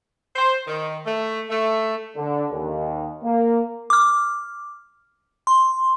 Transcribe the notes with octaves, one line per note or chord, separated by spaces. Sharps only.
C5
D#3
A3
A3
D3
D#2
A#3
D6 F6
C6